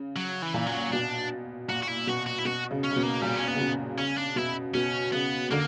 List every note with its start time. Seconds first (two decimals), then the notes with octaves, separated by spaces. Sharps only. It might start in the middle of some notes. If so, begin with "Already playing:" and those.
Already playing: C#3
0.16 F#3
0.42 E3
0.54 A#2
0.67 F#3
0.92 B2 D4
1.68 A#2 F#4
1.82 F#4
1.88 E4
2.07 B2 F#4
2.26 F#4
2.38 E4
2.45 B2 F#4
2.71 C#3
2.84 C#4
2.91 C#3
2.96 B2
3.03 A#3
3.22 A#2 G3
3.36 C#4
3.48 B3
3.55 C#3
3.60 B2
3.98 C#3 C#4
4.17 D4
4.36 B2 E4
4.74 B2 C#4
5.12 C#3 B3
5.51 D3 A#3